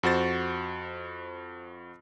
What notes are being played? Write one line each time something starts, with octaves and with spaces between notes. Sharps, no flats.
F2 F#4 C5 A6